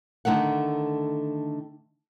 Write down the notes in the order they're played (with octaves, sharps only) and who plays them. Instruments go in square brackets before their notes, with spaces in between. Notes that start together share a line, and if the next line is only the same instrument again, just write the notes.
[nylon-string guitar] D3 D#3 A3 A#4 F#5